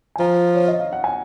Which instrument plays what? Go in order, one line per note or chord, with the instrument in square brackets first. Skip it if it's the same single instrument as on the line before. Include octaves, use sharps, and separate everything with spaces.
[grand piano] G#5
[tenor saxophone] F3 [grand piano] A#5
[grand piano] C#5
D#5
F5
F#5
G#5